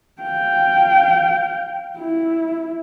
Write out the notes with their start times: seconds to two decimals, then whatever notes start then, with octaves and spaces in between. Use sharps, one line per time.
0.22 F5 G5
1.99 E4